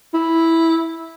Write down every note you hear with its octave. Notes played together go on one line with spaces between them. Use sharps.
E4